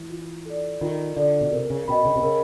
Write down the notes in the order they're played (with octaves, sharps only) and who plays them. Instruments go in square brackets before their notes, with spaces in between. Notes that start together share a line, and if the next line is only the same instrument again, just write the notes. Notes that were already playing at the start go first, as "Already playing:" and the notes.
Already playing: [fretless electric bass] E3
[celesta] F4
A4 D5
[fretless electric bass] D#3 [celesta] F4
[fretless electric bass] D3 [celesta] A4 D5
[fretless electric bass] B2
[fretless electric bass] C3 [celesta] A#4
[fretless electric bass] C#3
[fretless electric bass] B2 [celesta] D#5 G5 B5
[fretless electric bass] C#3
C3
[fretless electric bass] C#3 [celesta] A#4